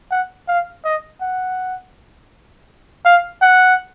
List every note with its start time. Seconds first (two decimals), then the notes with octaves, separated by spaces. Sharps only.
0.11 F#5
0.48 F5
0.85 D#5
1.22 F#5
3.05 F5
3.42 F#5